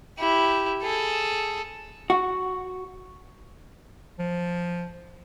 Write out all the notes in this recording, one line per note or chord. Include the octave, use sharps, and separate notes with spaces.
E4 G4
G#4 A4
F#4
F3